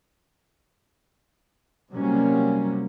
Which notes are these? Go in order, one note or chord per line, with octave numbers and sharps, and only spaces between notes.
C3 F#3 G3 A#3 C#4